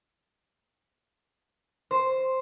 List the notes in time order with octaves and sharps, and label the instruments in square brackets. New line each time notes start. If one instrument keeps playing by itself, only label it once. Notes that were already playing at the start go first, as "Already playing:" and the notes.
[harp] C5